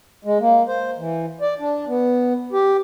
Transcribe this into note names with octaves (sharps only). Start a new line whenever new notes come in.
G#3
A#3
C5
E3
D5
D4
B3
G4